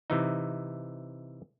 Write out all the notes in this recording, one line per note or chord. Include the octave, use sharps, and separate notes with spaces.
C3 E3 D#4